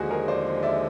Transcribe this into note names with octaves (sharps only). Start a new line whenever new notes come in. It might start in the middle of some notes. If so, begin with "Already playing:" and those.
Already playing: D#2 D3 F3 G#3 F#4 G#4
G#4 A#4
C5 D5
D5 E5